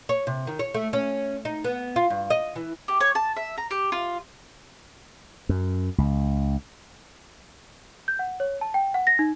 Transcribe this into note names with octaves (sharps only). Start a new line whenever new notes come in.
C#5
C3
D#3
C#5
A3
C#4
D#4
B3
F4
G2
D#5
E3
G4
C#5
A5
E5
A#5
G4
F4
F#2
C#2
G6
F#5
C#5
A5
G5
F#5
A#6
D#4